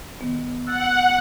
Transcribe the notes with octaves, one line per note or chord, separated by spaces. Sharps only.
D#3 B3
F#5 E6 F#6 A6